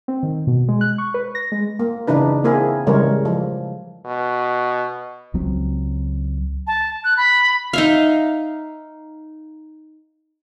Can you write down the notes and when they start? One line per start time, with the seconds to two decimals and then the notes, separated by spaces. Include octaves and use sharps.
0.08 C4
0.23 D#3
0.47 B2
0.68 G#3
0.81 F#6
0.98 C#6
1.14 B4
1.35 A#6
1.52 G#3
1.79 A#3
2.07 C#3 E3 D4 D#4 B4
2.44 A#3 C4 E4 G#4
2.87 C#3 E3 G3 G#3 A#4 C#5
3.25 F3
4.06 B2
5.34 C#2 F#3 C4
6.67 A5
7.04 F#6
7.17 B5
7.73 D#4 E5 F5